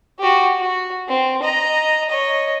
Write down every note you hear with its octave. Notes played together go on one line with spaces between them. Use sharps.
F#4 G4
F#4
C4
D#5 A#5
C#5 D#5